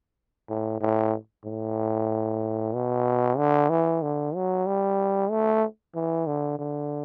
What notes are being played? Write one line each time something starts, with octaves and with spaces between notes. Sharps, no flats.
A2
A2
A2
B2
D3
E3
D3
F#3
G3
A3
E3
D3
D3